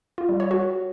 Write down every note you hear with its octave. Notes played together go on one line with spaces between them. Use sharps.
F4
G3
C#5
F#4